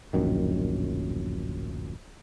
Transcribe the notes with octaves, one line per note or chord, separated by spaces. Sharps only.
D1 A#1 F#2 D#3